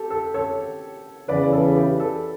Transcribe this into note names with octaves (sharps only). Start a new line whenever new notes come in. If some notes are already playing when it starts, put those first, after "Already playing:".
Already playing: G4 A4
A4
A4 C#5
E2 C#3 E3 B4 D5
A4
G4
A4